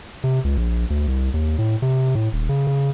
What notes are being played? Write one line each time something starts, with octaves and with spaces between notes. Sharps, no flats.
C3
C#2
A#1
D2
C2
D#2
A2
C3
A2
D#1
C#3
C#3